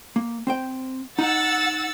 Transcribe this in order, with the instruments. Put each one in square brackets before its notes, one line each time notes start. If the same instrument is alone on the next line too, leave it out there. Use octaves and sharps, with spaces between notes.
[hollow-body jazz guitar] A#3
C4 C5 G5
[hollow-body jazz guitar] D#4 [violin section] F#5 E6 A6